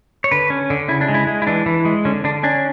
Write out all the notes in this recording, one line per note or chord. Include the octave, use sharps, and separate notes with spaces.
C#5
D3 B4
C#4
D3
C#3 E4
D4
G#3
E4
G#3
E4
E3 D4
E3
G#3
D3 C#4
D3 D4
C#4 D4